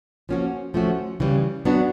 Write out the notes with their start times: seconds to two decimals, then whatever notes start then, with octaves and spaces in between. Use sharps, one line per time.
0.29 F3 A#3 C#4 F#4
0.74 F3 A3 C#4 F#4
1.20 C#3 E3 G3
1.65 F#3 B3 D4 F#4